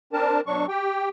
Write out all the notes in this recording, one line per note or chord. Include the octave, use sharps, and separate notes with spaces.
C4 D4 A#4 A5
B2 F#3 D4 C#6
G4 G5